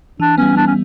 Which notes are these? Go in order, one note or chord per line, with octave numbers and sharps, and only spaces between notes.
E3 D4
G3 B3 C#4
E3 D4
C#4